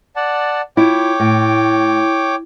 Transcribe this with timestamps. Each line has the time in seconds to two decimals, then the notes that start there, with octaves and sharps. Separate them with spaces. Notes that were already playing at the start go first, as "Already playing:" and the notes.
0.16 D5 F#5 A5
0.77 E4 F4 C#5 G5 D6
1.20 A2